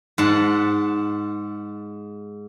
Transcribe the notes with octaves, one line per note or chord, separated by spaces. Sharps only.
G#2 F#5 A5